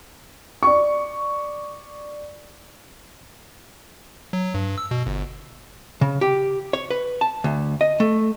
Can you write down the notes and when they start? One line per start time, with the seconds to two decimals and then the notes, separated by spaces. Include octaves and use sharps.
0.63 D5 C#6
4.33 F#3
4.54 G2
4.78 E6
4.91 B2
5.06 G1
6.01 C#3
6.21 G4
6.73 C#5
6.90 B4
7.21 A5
7.44 D2
7.81 D#5
8.00 A3